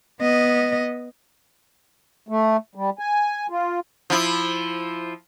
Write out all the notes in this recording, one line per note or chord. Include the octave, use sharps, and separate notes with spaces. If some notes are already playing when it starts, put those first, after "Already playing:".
B3 D#5
A3
G3
G#5
F4
F3 E4